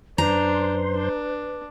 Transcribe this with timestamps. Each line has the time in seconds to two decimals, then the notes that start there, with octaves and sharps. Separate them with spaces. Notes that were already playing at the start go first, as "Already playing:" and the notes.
0.18 F#2 D4 B4 C5 A#5 C6
0.95 D4